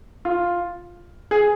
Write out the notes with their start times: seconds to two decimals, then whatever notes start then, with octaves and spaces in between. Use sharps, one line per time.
0.25 F4
1.31 G#4